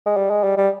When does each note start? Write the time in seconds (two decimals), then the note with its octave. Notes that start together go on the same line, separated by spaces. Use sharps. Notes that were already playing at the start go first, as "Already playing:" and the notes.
0.06 G#3
0.17 G3
0.30 G#3
0.44 G3
0.57 G3